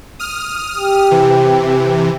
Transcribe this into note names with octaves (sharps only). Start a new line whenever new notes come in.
D#6 F6
G4
C3 E3